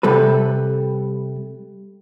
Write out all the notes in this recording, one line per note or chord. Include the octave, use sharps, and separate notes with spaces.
C3 G3 A4 B4